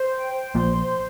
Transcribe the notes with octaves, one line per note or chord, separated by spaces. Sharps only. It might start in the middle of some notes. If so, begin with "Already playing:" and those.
Already playing: C5
G5
C5
A#1 A#2 C6
C5